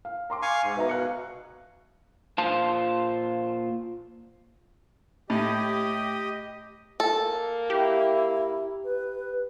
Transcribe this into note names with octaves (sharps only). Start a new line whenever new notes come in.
F5
A#5 C6 D6
F5 G#5 C#6
G#2
B2 B4 E5 A#5
F5 F#6 C#7
A#2 F4 C5 F5 A5
A2 G4 D#5
A#3 A4
E4 G4
B4